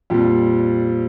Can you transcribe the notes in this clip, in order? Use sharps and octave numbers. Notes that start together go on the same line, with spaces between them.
F2 A#2 G3